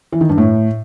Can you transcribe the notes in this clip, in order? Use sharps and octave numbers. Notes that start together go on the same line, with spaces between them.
E3
D#3
G2
A2